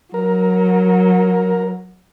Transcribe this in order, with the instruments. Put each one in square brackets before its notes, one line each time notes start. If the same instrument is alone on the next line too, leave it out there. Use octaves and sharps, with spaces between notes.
[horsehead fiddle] F#3 [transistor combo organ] A#4